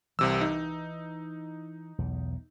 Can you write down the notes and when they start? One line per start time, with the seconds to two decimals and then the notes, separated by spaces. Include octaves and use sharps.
0.19 C2 C3 E3 E6
0.41 D#4
1.98 B1 E2